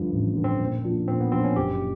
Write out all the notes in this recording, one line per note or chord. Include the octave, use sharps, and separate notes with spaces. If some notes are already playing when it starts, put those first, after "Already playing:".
Already playing: G2 D3 F3
A1
G2 D3 F3
C4
A#2
F3 A#3 D4 F4
A#2 C4
B3
F3 A#3 C4 D4 F4
C#4
F#1 G4